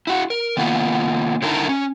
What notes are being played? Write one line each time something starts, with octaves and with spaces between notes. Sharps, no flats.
E4 F#4
A#4
D#3 A#3 B3 F4
D3 D#4 E4 A#4 A5 A#5
C#4